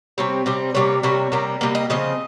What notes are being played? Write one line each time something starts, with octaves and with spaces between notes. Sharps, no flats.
C3 G3 C4 C#5
C3 G3 C4
C3 G3 A#3 C#5
C3 G3 A#3 C#5
C3 G3 A#3
C3 G3 A#3 D#5
D#5
C#3 F3 C4 D#5